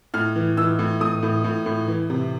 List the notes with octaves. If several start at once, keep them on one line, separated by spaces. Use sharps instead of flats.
A2 F6
E3
E3 E6
A2
A2 D#6
A2
A2
A2
E3
C3